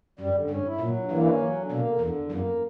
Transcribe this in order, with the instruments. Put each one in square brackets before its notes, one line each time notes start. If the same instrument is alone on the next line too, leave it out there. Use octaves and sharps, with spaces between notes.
[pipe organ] F#2 [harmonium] G3
[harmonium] D3
[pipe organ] G2 [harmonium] C#4
[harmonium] E4
[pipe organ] A#2 [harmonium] F#3
[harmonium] G2
[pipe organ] E3 [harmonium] A#3
[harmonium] C#4
F#3
D3
[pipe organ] B2 [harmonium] A#3
[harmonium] D3
[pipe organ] E2 [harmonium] D3
[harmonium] E2
[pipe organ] F#2 [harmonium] A#3